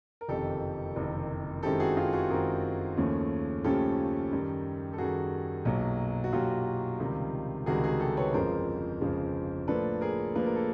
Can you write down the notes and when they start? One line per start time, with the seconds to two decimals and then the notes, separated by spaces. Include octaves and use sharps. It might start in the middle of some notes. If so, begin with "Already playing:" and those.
0.21 A#4
0.28 F#1 F2 C3 D#3 G4 A4
0.96 F#1 F2 C3 D#3
1.63 F#2 D#3 G#3 C4 E4 G4 A4
1.80 F#4 G#4
1.97 F4 G4
2.13 F#4 G#4
2.30 F#2 D#3 G#3 C4 E4 G#4 A#4
2.97 D#2 C#3 F3 A3 C#4
3.64 D#2 C#3 F3 A3 C#4 G4 A4
4.31 F#2 D#3 G3
4.93 A4
4.98 F#2 D#3 G3 F#4 G#4
5.65 B1 A#2 F#3
6.24 F#4
6.33 B1 A#2 F#3 F4 G4
7.00 C#2 C3 D#3 G3
7.66 C#2 C3 D#3 G3 F#4 G#4
7.84 F#4 G#4
8.00 G4 A4
8.17 B4 C#5
8.34 G1 F2 C#3 F3 G#3 A#4 C5
9.01 G1 F2 C#3 F3 G#3
9.68 A2 F3 A#3 D4 A4 B4
10.01 G#4 A#4
10.35 A2 F3 A#3 D4 B4
10.46 A#4
10.56 A4